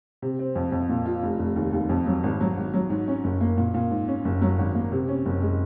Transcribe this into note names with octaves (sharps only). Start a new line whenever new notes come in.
C3
C4
F2
F2
A#2
F4
F1
F1
D#2
D#2
F2
F#3
G#1
F#3
G#1
F#3
G#2
C#4
F#1
A#3
A#2
A#2
G#2
C#4
F#1
F#3
G#1
A#3
C3
C#4
F#1
G#3